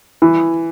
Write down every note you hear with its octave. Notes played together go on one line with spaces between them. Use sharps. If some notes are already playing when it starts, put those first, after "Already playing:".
E3